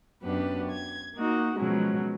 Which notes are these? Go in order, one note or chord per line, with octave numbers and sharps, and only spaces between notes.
F#2 B3 D4 G4 B4
G#6
A#3 D#4 F#4
B2 F3 F#3 G#3 C#4